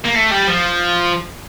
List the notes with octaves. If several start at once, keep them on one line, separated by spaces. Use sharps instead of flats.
A#3
A3
G3
F3